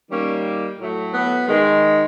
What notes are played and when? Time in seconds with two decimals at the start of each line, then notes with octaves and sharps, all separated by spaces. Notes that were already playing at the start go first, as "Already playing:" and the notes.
0.10 D#3 G3 A#3 C#4
0.79 A2 F#3 A3
1.14 B3
1.48 D#3 G#3